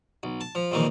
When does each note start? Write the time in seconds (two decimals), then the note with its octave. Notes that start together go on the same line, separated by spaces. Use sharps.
0.23 B1
0.41 A5
0.55 F3
0.71 A#1 F2 A#2 D#3 E3